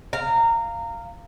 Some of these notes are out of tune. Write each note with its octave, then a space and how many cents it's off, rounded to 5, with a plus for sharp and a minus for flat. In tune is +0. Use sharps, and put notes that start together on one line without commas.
F5 -5 A#5 -20